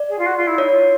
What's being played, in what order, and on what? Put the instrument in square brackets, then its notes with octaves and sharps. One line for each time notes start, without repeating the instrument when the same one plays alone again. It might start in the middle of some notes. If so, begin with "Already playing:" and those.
Already playing: [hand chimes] D5
[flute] G#4
F4
F#4
F4
E4
[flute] D#4 [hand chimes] C#5
[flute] F4